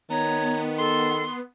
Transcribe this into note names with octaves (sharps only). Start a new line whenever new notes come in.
D#3 B3 C#5 A#5
A4 C6